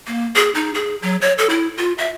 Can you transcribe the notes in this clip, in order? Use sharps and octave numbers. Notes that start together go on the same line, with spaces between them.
A#3
G#4
D#4
G#4
F#3
C#5
A4
E4
F4
E5